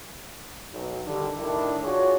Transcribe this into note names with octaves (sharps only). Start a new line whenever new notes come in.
B1
D3 D#3 G3 D4
A2 D#3 D4 E4
D4 F4 F#4 G#4 C#5